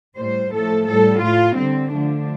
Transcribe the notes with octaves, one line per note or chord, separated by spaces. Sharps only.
A2 G3 C5
A2 F3 A3 A4
A2 G3 A4
A2 A3 F4
D3 G3 C4
D3 F3 A3 D4